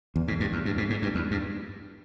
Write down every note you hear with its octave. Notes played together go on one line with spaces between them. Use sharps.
E2
G#2
G2
E2
G2
G#2
G#2
G2
E2
G2